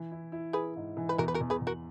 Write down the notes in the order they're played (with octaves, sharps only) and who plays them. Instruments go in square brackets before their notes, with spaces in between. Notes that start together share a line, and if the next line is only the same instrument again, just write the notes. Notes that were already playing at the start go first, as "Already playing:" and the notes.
Already playing: [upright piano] E3
E4
E4
[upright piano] E4 [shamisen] G#4 B4
[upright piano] G#2
E3
[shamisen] B4
[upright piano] E2 [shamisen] F#4 A#4
[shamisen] B4
F#4 A#4
[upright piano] E2
[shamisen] G#4 B4
[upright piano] E2
[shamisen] F#4 A#4